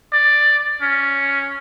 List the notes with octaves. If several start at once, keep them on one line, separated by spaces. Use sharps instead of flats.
D5
C#4